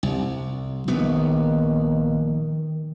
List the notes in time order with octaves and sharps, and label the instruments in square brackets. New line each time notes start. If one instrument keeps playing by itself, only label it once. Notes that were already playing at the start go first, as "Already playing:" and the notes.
[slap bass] C2
[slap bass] A#1 B3 [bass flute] D#3